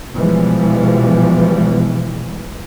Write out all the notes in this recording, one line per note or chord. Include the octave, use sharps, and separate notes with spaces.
B2 E3 F3 G3 G#3